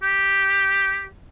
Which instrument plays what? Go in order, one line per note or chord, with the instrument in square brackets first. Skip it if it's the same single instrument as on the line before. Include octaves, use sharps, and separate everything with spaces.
[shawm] G4